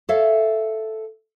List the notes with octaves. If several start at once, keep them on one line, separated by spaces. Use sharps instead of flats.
A4 C#5 E5 F5